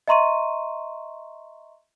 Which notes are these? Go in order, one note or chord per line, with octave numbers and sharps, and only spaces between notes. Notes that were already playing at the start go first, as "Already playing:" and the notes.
D#5 E5 A#5 C6 C#6 D#7